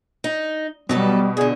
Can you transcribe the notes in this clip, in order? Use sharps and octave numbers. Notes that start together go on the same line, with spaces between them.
D#4
B2 F#3 G3 A4 B4
A#2 D3 G#4